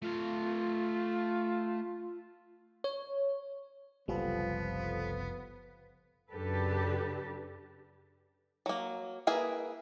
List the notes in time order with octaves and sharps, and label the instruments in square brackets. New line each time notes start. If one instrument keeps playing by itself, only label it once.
[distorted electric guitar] A3 F5 [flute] F4
[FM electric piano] C#5
[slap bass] F#1 C2 [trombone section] F3 [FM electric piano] G3 F4 A4 [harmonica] B3
[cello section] F#2 C#3 D4 G4 A4 B4
[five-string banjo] F#3 A#3
A#3 E4 G#4 A#4 B4